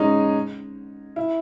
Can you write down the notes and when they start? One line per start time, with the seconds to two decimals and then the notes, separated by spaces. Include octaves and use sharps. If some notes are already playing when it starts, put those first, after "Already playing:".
Already playing: G#3 C#4 D#4
1.16 E4